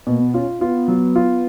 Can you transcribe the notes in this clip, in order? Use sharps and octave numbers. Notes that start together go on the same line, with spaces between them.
B2 A#3
B3
C#4 F4
C#4
B3 F4
F#3
F4